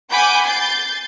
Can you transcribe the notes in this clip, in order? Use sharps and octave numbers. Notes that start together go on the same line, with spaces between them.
F#5 G#5 B5 D6 G6
G6 A6 C7